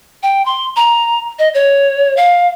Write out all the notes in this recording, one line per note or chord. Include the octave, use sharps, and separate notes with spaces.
G5
C6
A#5
D#5
C#5
F5